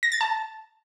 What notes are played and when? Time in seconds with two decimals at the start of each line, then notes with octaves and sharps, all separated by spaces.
0.03 A#6
0.12 A6
0.21 A5